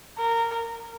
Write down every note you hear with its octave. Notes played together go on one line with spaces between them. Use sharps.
A#4